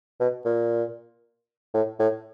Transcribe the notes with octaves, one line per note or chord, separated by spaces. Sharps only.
B2
A#2
A2
A2